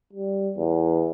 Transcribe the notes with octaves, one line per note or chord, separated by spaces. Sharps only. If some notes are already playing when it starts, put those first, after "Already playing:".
G3
E2